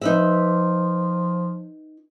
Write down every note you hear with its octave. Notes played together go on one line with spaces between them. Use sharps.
F3 D#4 B4 E5